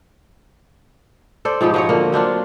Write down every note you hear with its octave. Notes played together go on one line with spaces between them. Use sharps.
A4 C5 D5
G#2 F3 B3 G4
F3 F#4 C#5
D3 A#3
F#3 C4 D4 F4